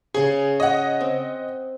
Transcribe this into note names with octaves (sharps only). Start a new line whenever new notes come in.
C#3 G#4 C#6
D#5 F#5
C4